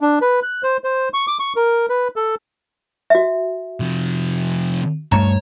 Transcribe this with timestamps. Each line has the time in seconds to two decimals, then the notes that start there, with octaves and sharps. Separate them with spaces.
0.01 D4
0.21 B4
0.43 F#6
0.63 C5
0.84 C5
1.14 C#6
1.28 D6
1.40 C#6
1.56 A#4
1.89 B4
2.16 A4
3.10 F#4 E5
3.80 C3 F3
5.12 G2 A3 C#5 A#5